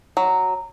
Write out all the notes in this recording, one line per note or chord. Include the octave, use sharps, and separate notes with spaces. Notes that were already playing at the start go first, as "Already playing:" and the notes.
F#3